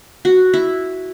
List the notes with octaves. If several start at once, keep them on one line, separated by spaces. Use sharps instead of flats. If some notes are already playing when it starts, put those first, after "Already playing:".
F#4
E4